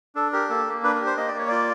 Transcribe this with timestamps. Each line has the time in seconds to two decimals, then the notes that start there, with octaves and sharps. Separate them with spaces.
0.15 D4 A4
0.33 G4 A#4
0.50 A#3 A4
0.67 A#3
0.83 D4 B4
0.95 A#4
1.01 G4
1.06 C5
1.17 A#3 D#5
1.28 D5
1.34 A#3 C#5
1.48 F4 D5